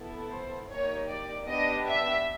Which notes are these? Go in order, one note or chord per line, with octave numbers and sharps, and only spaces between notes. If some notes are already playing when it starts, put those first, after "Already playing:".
Already playing: B3 E4 A4
C5
A#3 D#4 G4 C#5
D5
B3 D4 G4 D#5
E5